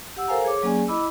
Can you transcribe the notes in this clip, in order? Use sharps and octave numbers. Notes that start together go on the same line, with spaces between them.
G4 F#5 E6
A4 A#4 C5 F5 G#5 A#5
G#4 C#5 D6
F#3 A#3 C#4 G#4 D5 G#5
E4 D#5 B5 D6 E6